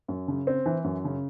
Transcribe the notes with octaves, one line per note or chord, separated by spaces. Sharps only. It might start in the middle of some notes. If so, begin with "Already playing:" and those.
F#2
C#3
C4
E3
F#2
C#3